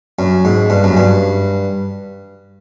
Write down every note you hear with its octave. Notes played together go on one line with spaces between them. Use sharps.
F#2
G#2
G2
F#2
G2